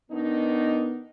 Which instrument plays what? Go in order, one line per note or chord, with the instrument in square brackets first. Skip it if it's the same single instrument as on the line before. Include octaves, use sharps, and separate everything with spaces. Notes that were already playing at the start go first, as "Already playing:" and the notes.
[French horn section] D#3 D4 D#4 [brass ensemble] B3